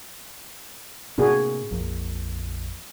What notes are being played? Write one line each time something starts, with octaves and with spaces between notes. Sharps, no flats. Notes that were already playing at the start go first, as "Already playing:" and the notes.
A2 C3 A#3 D4 F#4 G#4
A#1 F2 A#2